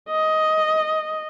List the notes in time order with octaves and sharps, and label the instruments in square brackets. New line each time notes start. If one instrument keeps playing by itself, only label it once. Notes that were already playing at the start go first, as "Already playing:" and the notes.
[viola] D#5